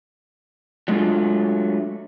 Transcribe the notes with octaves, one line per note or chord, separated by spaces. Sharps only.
F#3 G#3 A3 D4 F4